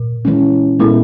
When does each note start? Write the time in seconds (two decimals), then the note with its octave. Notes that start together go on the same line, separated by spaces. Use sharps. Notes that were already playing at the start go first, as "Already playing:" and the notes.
Already playing: A#2
0.25 E3 G#3 C#4
0.80 A#2 G#3 B3 E4 A4